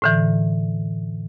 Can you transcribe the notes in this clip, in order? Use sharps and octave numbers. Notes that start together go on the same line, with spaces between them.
A2 D3 E3